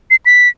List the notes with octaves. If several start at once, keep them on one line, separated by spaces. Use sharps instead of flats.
C7
B6